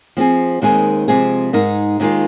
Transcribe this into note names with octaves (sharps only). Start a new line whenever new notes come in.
F3 C4 G#4
D#2 D#3 G#3 C4 G#4
C3 F3 G#3 C4 G#4
G#2 G#3 D#4 A#4
D#2 D#3 G#3 F4